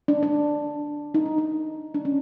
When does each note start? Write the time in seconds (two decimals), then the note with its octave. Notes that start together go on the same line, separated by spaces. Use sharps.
0.08 D4
0.23 D4
1.14 D#4
1.26 D4
1.38 D#4
1.94 D4
2.05 C#4